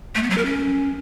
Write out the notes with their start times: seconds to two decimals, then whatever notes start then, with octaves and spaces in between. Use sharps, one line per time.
0.15 A3
0.23 B3
0.30 F#3
0.38 A#4
0.45 C#4